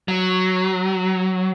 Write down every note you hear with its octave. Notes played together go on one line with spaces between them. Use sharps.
F#3